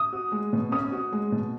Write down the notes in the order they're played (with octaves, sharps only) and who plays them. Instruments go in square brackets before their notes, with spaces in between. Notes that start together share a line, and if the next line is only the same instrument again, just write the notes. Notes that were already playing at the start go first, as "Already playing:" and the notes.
Already playing: [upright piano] D#6
[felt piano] F#4
G#3
B2
[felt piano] C#4 [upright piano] D#6
[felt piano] F#4
G#3
B2